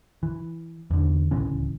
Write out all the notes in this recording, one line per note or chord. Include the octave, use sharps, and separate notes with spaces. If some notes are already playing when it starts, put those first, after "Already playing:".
E3
E2 D3
D1 C#2 E3 C#4